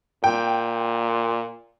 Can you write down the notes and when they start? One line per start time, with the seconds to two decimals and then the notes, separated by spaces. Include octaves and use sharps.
0.24 A#2 G5